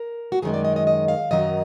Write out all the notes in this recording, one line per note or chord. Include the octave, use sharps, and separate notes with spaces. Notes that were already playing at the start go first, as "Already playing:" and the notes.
Already playing: A#4
F#4
F#2 D#3 G#3 G#4
D5
D#5
D#5
D#5
F5
F#2 D#3 F#3 D#5